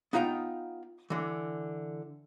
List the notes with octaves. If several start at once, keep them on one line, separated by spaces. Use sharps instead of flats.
B3 D#4 F4 F5 G5
D3 E3